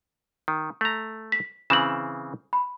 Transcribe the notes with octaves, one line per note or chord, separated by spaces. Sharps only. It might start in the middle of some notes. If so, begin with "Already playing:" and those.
D#3
A3 A#5
B6
C#3 E3 C4 E7 F#7
B5